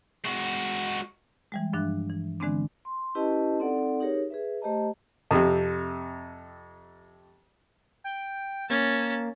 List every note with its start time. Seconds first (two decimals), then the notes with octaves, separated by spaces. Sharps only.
0.24 G#3 F#4
1.52 E3 G3 G#3
1.73 G2 F3 D4 E5 F#6
2.10 E3
2.40 D3 E3 G#3 B3 C4 D4
2.85 C6
3.15 C#4 E4 G4 B4 D#5 A5
3.60 C4 D#4 A4 D5 F#5
4.00 D#4 G4 G#4 A#4 C#5
4.30 G#4 B4 E5
4.61 A3 G4 C5 D#5 A5 A#5
5.31 F2 C3
8.04 G5
8.70 A#3 C#4 A5